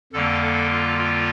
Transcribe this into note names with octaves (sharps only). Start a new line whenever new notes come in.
F2 D3 G3 A#3 A4
A4
F4
F4